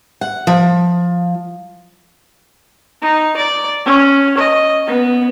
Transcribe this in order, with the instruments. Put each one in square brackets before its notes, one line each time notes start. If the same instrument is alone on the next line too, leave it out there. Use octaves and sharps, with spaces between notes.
[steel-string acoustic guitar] F#5
F3
[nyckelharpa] D#4
D5
C#4
D#5
B3